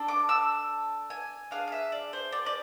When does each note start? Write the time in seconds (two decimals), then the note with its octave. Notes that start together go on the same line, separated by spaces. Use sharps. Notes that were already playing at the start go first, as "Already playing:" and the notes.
Already playing: D4 A4
0.08 D6
0.29 E6
1.10 G#5
1.51 D4 G#4 F5
1.68 F5
1.72 E5
1.92 D5
2.13 C5
2.32 D5
2.46 D5